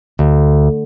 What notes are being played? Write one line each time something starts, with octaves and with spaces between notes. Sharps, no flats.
D2